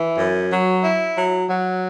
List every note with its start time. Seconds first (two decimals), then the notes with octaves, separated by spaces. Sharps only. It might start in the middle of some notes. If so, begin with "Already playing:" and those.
Already playing: E3
0.17 F#2
0.50 F#3
0.83 E4
1.17 F#3
1.49 F#3